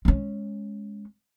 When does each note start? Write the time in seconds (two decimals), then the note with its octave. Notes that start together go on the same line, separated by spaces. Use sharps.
0.05 G#3 C#4